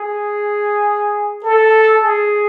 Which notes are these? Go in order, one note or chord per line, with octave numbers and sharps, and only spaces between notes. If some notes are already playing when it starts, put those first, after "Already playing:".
Already playing: G#4
A4
G#4